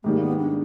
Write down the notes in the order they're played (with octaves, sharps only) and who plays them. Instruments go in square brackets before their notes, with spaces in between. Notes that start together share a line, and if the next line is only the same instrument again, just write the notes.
[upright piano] G#2 D#3 G3 [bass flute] A#3
[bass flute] B3
D4